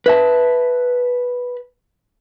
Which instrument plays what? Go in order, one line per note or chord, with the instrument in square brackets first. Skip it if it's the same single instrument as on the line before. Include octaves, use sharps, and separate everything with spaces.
[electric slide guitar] B4 E5 A5